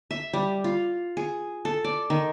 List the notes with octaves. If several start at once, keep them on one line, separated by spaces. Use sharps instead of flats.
E5
G3
F4
G#4
A4
D5
D#3